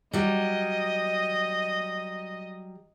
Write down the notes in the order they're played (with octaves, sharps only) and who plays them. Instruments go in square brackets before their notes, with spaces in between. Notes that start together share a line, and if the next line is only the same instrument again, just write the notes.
[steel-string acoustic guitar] F#3 G3 [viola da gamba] D#5